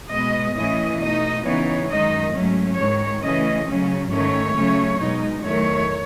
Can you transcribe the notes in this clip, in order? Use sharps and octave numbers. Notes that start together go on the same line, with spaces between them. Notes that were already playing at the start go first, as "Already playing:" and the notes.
B2 G#3 B3 D#5
A2 E3 A3 C#4 D#5
B2 A3 D#4 D#5
C#3 E3 B3 D#4 C#5
F#2 D#3 G#3 D#4 D#5
G#2 F#3 A3 C#4
G#2 D#3 G#3 C#5
C#3 E3 A3 C#4 D#5
C#3 F#3 C#4
G#2 D#3 A3 C#4 C#5
C#3 F#3 A3 C#4
B2 G#3 D#4
E2 D#3 F#3 A3 C#5